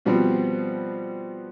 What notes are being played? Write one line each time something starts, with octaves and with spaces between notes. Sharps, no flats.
B2 F3 G3 B3 C4